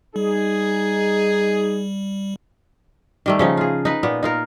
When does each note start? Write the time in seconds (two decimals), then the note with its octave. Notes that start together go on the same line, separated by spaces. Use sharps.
0.16 G3 D#4 G#4
3.26 D#3 G3 A3
3.39 C#3 F3 D#4
3.57 F4 G#4
3.85 D#4 B4
4.03 A#2 B3
4.23 D#4 F4 A#4